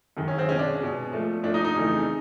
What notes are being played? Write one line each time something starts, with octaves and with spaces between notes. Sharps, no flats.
F#2 D#3 G#3
C#4
C4
B2 G#3 C#4
D4
B2 G#3
A#2 F3 A3
A#2 F3 A3 D4
D#4
D#4
F2 C#3 E3 A3